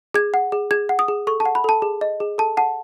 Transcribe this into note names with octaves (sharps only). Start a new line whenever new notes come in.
G#4 G#6
F#5
G#4
G#4 G#6
F#5
D#6
G#4
A4 C#6
A5
F#5
B5
A4 A5
G#4
D#5
G#4
A4 A5
F#5 A5